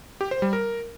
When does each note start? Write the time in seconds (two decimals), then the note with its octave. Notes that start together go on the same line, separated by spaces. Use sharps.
0.21 G4
0.31 C5
0.42 G3
0.53 A#4